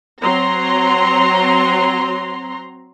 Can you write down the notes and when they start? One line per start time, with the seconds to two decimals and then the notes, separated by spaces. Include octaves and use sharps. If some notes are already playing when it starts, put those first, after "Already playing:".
0.21 F#3 C4 A#5 C6